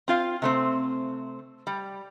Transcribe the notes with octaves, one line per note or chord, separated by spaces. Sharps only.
C4 F4 F5
C3 A3 C4
G3